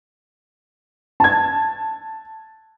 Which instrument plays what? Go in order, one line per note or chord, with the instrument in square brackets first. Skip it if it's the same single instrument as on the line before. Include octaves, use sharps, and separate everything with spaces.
[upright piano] A5 G#6